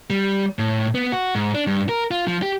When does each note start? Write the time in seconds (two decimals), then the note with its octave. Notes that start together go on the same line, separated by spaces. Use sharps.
0.10 G3
0.59 A2
0.95 B3
1.12 F#4
1.35 G#2
1.55 D4
1.67 G2
1.89 A#4
2.11 F4
2.27 F3
2.42 G4